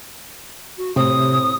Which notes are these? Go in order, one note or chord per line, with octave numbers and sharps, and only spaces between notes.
F#4
A2 C3 C4 D#6